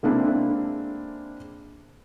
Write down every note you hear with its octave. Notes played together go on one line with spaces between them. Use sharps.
G#3 A#3 C4 D4 E4